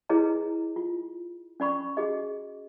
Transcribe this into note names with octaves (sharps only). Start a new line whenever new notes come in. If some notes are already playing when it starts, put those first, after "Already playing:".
E4 G#4 B4 C#5 D#5 A#5
F4
C#4 D5 B5 C#6
F#4 G#4 D#5